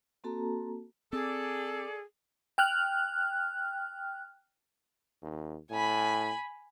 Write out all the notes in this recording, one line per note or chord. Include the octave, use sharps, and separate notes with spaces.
A#3 C4 F#4 A4 A5 A#5
C4 G#4 A4 D5
G5 F6 F#6
D#2
A2 G#5 B5